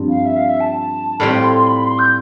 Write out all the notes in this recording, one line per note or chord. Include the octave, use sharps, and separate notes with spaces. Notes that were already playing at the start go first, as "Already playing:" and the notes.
Already playing: G2 F3 C4
F5
E5
F5
E5
A5
A2 G3 C4 F4 B5
C6
C6
B5
C6
G6